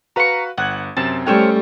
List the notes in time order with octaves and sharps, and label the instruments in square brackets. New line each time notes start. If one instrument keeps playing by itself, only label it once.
[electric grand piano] F#4 B4 F5 [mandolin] A#5 C#6
[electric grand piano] G1 G#6 [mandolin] F#5
[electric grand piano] F#2 C3 C4 [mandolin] A5
[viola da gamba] G3 A3 [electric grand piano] C#4 A4 G5 [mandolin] C5 C#5 F6